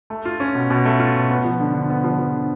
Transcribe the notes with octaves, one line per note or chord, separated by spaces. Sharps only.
A3
F4
C#4
B2
B2
A3
F4
B2
B3
F3
D3
D3
B3
F3
F3
D3